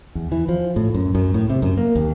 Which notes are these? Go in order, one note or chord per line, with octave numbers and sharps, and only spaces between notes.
E2
E3
F3
A2
F#2
F#2
A2
C3
F#2
A#3
D#2